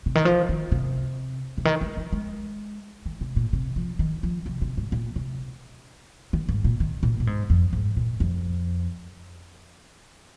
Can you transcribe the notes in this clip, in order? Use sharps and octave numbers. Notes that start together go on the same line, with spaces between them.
C3
D#3
F3
D#3
C3
C3
D#3
G#3
F3
G#3
D#3
C3
A#2
C3
F3
D#3
F3
C3
C3
G#2
A#2
C3
D#3
G#2
A#2
D#3
A#2
A#2
G#2
F2
G#2
A#2
F2